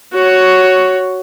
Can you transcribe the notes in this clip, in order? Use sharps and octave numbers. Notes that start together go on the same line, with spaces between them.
F#4 C#5